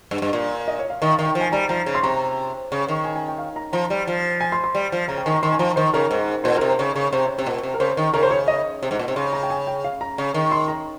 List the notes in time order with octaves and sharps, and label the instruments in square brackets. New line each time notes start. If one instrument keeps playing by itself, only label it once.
[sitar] G2
G2
A#2
[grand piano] D#5
C#5
F5
[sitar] D#3 [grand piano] D#5
[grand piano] F5
[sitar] D#3 [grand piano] D#5
[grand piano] G5
[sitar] F3
[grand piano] G#5
[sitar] G3 [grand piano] A#5
[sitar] F3 [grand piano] A#5
[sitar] C#3
[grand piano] C6
[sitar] C3 [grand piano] A#5
[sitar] C#3
D#3
[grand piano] G#5
G#5
G5
F5
A#5
[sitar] F3 [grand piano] A#5
[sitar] G3
F3
[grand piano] G#5
C6
C6
[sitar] G3
F3
[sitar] C#3 [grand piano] A#5
[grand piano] G5
[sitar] D#3 [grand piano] G#5
[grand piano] A#5
[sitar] D#3 [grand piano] C6
[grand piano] G#5
[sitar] F3 [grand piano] A#5
[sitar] D#3 [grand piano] C5
[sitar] C#3 [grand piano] A#4
[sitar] G#2
[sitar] A#2 [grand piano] C5
[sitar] C3 [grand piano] A#4
[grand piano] C5
[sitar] C#3
C#3
[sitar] C3 [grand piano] C5
[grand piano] C#5
[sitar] C3 [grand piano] C5
[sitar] A#2
C3
[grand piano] A#4
[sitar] C#3 [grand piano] C5
[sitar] D#3
[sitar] C#3 [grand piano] A#4
[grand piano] C5
C#5
D#5
[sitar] C3
G#2
A#2
C3
[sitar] C#3 [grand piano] C6
[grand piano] A#5
G5
G#5
G5
F5
A#5
[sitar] C#3
D#3
[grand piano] C6
A#5